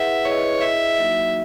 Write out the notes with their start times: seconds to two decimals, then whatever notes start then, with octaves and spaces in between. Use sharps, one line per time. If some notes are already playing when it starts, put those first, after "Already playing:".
Already playing: E4 G#4 B4 E5 F#5
0.25 E4 G#4 B4 C#5 D#5
0.61 E4 G#4 D#5 E5
0.98 F#3 A#3 D#4 F#4